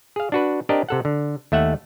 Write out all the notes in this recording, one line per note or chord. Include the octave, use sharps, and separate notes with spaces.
G#4 F5
D4 F#4 B4
C4 D4 G4 A#4 D#5
C3 A4 F#5
D3
D#2 A3 E5 F#5